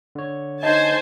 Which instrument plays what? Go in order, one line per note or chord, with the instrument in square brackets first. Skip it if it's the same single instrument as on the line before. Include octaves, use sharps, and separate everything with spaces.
[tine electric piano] D3 C#5
[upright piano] D#4 [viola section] C5 G#5 A5